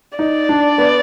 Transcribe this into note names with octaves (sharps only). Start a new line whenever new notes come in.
D#4 D5
D4
B3